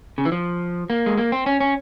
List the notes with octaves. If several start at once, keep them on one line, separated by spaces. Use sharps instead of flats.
C#3
E3
F3
A#3
G#3
A#3
C4
C#4
C#4